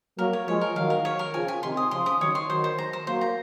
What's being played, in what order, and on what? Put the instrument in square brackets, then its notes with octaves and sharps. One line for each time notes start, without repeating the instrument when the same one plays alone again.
[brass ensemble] F#3 A#3 [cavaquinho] A#4
[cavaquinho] C#5
[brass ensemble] F3 G#3 [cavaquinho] C#5
[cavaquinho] A#4
[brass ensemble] D#3 F#3 [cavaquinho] F5
[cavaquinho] A#4
C#5
A#4
[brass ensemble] C#3 F3 [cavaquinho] G#5
[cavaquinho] G#5
[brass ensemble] C3 D#3 [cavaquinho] C6
[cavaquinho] D#6
[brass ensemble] C#3 F3 [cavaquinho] C6
[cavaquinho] D#6
[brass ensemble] D#3 F#3 [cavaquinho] C#5
[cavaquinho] C6
[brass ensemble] D#3 F#3 [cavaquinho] C5
[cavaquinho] C5
A#5
C5
[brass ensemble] F#3 A#3 [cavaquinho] C5
[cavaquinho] A#5